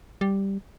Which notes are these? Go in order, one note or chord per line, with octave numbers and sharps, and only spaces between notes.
G3